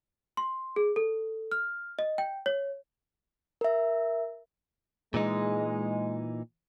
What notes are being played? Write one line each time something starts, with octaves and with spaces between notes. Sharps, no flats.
C6
G#4
A4
F6
D#5
G5
C#5
A#4 E5
A#2 E3 G#3 D#4